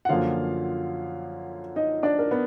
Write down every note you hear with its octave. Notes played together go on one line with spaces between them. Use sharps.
F#5
F#2 D3 F3 A#3 F4 F5
D#4 D#5
D4 D5
A#4
B3